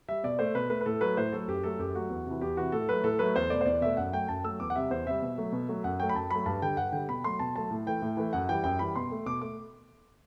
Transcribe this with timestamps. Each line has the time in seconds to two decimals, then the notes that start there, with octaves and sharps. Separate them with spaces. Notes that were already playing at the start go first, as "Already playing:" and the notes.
0.08 G3 E5
0.24 B2 D5
0.39 A3 C5
0.55 B2 B4
0.70 A3 B4
0.81 B4
0.86 A2 A4
1.01 F#3 A3 B4
1.17 A2 C5
1.32 F#3 A3 A4
1.48 F#2 G4
1.64 F#3 A3 A4
1.79 F#2 G4
1.94 F#3 A3 F#4
2.10 E2
2.26 C3 E3
2.41 E2 G4
2.57 C3 E3 F#4
2.72 A2 A4
2.88 F#3 A3 B4
3.03 A2 A4
3.19 F#3 A3 B4
3.36 E2 C5
3.50 B2 A3 D5
3.61 C5
3.66 E2 D5
3.81 B2 A3 E5
3.97 F#2 F#5
4.12 F#3 A3 G5
4.28 F#2 A5
4.44 F#3 A3 E6
4.60 E2 D6
4.70 F#5
4.75 C3 G3 E5
4.90 E2 C5
5.06 C3 G3 E5
5.22 B2
5.38 F#3 A3
5.52 B2
5.69 F#3 A3
5.84 F#2 F#5
6.00 F#3 A3 G5
6.09 B5
6.15 F#2 A5
6.31 F#3 A3 B5
6.46 G2 A5
6.62 D3 G3 G5
6.77 G2 F#5
6.92 D3 G3 G5
7.09 B2 B5
7.24 F#3 A3 C6
7.39 B2 A5
7.55 F#3 A3 A5
7.71 A2
7.87 E3 A3 G5
8.02 A2
8.17 E3 A3
8.33 F#2 F#5
8.49 E3 G3 G5
8.64 F#2 G5
8.79 E3 G3 B5
8.95 B2 C6
9.12 A3
9.26 B2 D6
9.42 A3 D6